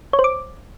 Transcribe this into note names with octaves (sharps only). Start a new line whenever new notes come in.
C#5
C5
D6